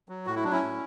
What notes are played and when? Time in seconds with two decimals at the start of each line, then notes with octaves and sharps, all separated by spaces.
0.09 F#3
0.26 A2 F#4
0.36 E4
0.44 F#3 D4
0.52 C#4 E4
0.62 A2